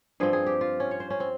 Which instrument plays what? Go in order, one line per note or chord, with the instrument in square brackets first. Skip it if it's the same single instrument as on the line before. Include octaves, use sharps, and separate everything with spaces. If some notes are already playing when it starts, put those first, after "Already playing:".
[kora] G2 F3 C4 G#4
G#4
G4
F4
C#4
C#5
C5
C#4
C4